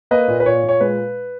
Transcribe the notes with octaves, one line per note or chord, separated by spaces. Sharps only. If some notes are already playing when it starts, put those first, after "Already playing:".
A#3 B4 D#5
A#2
B4
A#2 C#5
A#2
C#5
G#3 B4